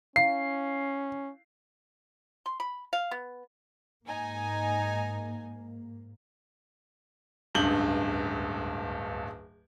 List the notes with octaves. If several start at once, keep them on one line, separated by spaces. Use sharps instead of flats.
C#4 E4 F5 C7
C6
B5
F5
B3
G#2 A#3 D#4 G#5
D1 C#2 G2 G6 F#7 G7